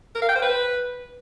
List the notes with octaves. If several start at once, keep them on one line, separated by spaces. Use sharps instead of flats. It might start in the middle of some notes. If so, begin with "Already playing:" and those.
A#4
F5
G5
C5
B4